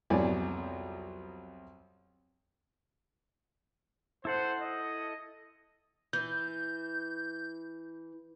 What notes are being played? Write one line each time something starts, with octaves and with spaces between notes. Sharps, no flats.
C2 F2 F#3 B3 D5 G#5
E4 A4 C5 F#5
D#5
E3 G6